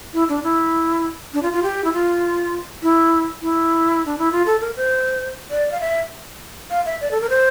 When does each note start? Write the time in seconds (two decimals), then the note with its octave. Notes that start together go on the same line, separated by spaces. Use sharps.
0.13 E4
0.29 D4
0.43 E4
1.34 D4
1.43 F4
1.53 F4
1.63 G4
1.84 E4
1.93 F4
2.83 E4
3.42 E4
4.06 D4
4.18 E4
4.32 F4
4.46 A4
4.61 A#4
4.76 C5
5.51 D5
5.72 F5
5.81 E5
6.71 F5
6.86 E5
7.01 D5
7.11 A4
7.21 A#4
7.30 C5